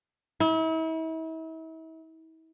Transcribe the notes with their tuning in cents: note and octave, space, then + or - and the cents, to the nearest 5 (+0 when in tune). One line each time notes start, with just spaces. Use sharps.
E4 -40